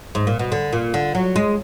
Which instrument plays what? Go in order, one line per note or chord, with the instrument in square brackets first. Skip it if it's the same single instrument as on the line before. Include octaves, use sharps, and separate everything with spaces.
[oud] G#2
A#2
B2
D3
A#2
D3
F#3
G#3